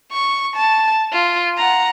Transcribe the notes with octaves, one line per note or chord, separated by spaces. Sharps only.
C#6
A5
F4
F#5 A#5